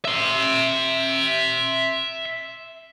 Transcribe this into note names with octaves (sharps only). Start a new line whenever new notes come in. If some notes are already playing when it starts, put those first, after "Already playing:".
E5 C6